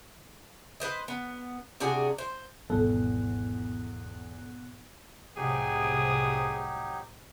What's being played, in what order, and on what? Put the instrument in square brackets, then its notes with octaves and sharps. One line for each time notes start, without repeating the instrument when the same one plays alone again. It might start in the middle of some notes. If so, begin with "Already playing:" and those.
[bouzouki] B4 C5 D#5
B3
C3 D4 F#4 G#4
C5
[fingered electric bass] G#1 G3 [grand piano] E2 [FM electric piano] B2 B3 F#6 [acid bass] A4
[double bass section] C2 A2 C3 [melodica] F#3 D#4 G4 [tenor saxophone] G#4